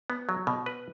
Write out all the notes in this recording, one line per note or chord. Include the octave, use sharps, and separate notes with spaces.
B3
F#3
B2
B4